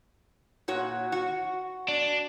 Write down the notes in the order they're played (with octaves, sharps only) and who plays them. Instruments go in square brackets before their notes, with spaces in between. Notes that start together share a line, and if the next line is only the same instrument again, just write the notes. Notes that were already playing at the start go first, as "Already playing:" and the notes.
[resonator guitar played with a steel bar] A#2 F#4 C#5
F#4
[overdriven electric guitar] D4